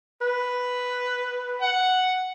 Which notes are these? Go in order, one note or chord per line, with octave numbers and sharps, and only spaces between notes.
B4
F#5